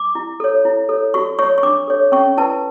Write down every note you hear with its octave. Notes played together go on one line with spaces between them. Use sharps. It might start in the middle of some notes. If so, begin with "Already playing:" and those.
Already playing: D6
E4
A4 C#5
E4
A4 C#5
F#4 C#6
C#5 C#6
C#6
D4 D6
A4 C#5
C#4 C#6
E4 B4 A5